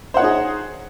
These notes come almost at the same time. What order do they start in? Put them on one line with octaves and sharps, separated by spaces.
C5 F#5 C#5 D#4 G#4